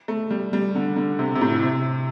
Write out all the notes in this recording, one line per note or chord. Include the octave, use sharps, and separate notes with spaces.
A3
G3
G3
D3
D3
C3
C3
A2
C3